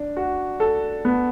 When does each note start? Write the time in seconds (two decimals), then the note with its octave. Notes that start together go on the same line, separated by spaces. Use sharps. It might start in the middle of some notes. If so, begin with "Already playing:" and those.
Already playing: D4
0.17 F#4
0.60 A4
1.05 B3